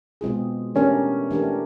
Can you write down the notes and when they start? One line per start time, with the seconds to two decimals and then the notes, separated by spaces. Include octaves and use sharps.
0.21 B2 G#3 C4 F4 G#4
0.75 E3 A3 C#4 D4 G4 A#4
1.31 E3 A3 D4 G4 A#4